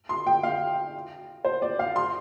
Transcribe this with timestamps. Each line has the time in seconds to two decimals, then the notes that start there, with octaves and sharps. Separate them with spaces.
0.09 C6
0.26 G5
0.43 F5
1.45 C5
1.62 D5
1.79 F5
1.96 C6